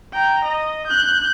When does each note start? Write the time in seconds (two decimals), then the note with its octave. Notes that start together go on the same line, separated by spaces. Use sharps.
0.13 G5 A#5
0.45 D#5
0.87 F#6 G6